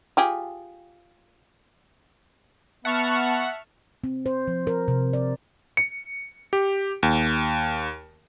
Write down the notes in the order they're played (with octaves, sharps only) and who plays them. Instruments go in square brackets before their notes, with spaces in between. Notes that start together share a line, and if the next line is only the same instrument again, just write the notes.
[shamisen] F4 G4 G#4
[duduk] B3 [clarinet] E5 [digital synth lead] F#5 [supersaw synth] A5 C#6 F6
[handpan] C4
C5
F3
A#4
C3
D5
[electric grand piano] C#7
G4
D#2